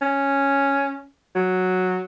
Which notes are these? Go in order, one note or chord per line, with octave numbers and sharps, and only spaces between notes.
C#4
F#3